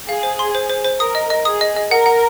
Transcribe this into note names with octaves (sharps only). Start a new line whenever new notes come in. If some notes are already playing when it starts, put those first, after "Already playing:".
G#4 F5
C5
C6
C5
C5
C5
A#4 D#6
D#5
D#5
G#4 D#6
D#5
D#5
A#4 F#5
F#5